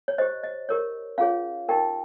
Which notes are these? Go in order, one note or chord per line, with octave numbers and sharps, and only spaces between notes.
C#5
G4 C5 D#5
D#5
G4 A#4 C#5
C#4 F4 G#4 C#5 F5
D#4 G4 A#4 G5